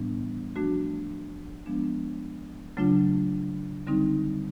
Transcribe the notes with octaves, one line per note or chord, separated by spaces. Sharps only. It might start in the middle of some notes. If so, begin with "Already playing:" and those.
Already playing: A2 E3 G3 B3 D4
F3 A3 D4 F#4
F3 G#3 B3 D4
C#3 F#3 A3 D4 F4
D3 G3 C4 D#4